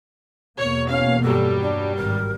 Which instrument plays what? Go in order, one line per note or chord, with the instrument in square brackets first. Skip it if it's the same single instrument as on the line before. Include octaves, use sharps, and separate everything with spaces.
[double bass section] E2 B2 A#3 [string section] C#5
[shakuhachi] C#4 [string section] F5
[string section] G2 F#3 G3 [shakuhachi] A4
[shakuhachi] D4
[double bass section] G#1 [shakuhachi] A#4